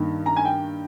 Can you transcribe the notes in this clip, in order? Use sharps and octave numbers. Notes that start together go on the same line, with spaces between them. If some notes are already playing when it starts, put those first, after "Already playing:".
Already playing: G2 D#3 A#3
A#5
G#5
G5